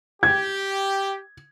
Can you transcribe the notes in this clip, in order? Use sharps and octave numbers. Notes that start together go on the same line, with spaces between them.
G4 G#6